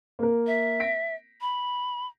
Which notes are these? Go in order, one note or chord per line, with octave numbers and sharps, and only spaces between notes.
A#3 A#4
E5
A#6 B6 D7
B5